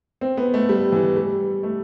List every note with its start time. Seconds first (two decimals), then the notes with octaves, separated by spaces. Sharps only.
0.21 C4
0.37 B3
0.54 A3
0.69 G3
0.92 E3
1.17 G3
1.63 A3